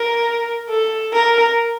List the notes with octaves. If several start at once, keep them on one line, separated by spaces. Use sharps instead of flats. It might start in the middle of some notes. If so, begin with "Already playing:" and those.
Already playing: A#4
A4
A#4